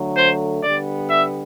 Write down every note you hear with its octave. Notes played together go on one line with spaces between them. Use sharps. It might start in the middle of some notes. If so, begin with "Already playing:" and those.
Already playing: D3 F#3 A3
C5
D3 G3 B3 D5
E5